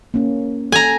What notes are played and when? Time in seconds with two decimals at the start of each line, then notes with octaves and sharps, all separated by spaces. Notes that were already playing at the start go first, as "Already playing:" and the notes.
0.14 A#3 C#4
0.72 A4 G#5 A#5